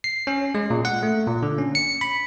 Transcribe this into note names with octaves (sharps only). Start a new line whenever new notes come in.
C7
C#4
G#3
A#2
F#5
A3
A#2
D3
C#4
C#7
B5